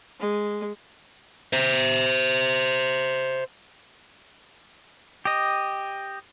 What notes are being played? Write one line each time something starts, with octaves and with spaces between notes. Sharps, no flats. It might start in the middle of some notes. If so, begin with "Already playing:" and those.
G#3
C5 E5
G4 D#5